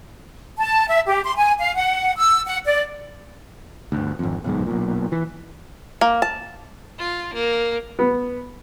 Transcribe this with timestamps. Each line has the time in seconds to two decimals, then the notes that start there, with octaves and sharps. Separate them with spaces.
0.58 A5
0.88 E5
1.07 G4
1.24 C6
1.36 G#5
1.59 F5
1.75 F#5
2.17 E6
2.46 F#5
2.65 D5
3.92 G1 D2
4.19 G#1 F2
4.44 D1 B1 G#2
4.66 B1 A#2
5.12 E3
6.01 A#3
6.22 A5
6.99 F4
7.33 A#3
7.99 B3